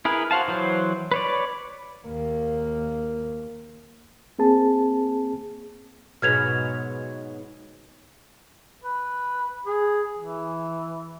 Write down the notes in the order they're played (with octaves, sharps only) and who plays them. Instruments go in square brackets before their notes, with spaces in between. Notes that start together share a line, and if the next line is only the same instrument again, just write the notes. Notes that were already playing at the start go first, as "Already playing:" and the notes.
[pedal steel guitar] E4 G#4 A#4 B4
F#4 C5 F5 A5
E3 F#3 C5
B4 C#5 D5
[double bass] D#2 A#3
[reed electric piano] A#3 C4 G#4 A5
[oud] G#2 B2 F#3 [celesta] F6 G#6 F7
[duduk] B4
G#4
E3